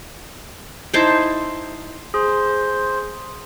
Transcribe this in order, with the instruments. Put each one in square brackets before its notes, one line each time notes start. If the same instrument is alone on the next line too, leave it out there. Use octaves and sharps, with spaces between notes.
[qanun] D#4 E4 C5 A5
[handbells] G#4 [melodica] C5